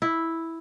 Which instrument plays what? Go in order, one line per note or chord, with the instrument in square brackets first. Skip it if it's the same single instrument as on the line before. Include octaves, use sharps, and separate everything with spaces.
[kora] E4